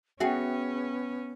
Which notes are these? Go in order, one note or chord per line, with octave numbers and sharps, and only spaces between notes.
B3 C#4 F#4 G#4 E5 G5